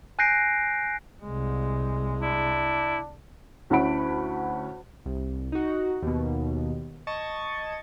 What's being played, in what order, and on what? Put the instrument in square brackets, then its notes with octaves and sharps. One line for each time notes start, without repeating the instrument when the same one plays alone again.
[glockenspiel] G#5 F#6 G6 A#6 C7 D7
[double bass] C2 G#3
[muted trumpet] D4 [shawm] E4
[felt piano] D2 C#4 E4 F#5 B5 D7
[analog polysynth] C2
D#4 F#4
D#2 B2
D#5 A5 C#6 G#6 A6